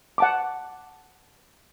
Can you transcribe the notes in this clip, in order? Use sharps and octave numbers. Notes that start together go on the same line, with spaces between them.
F#5 A5 D6